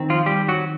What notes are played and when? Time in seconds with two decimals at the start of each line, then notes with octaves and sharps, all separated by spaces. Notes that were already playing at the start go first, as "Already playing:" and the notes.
Already playing: D#3 C4
0.10 F3 F4
0.26 G3 G4
0.48 F#3 F#4